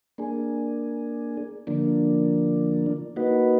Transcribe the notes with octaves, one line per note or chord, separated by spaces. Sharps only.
A#3 D4 G#4
D3 F3 A#3 D4
A#3 D#4 F#4 B4